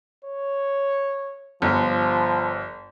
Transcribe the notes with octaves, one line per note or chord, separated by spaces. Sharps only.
C#5
G1 F3